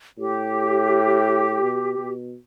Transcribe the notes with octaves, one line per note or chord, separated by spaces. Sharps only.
A2 G4
B2
B2